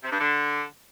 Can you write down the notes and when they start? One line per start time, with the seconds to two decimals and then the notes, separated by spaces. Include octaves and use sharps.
0.04 C3
0.12 G2
0.20 D3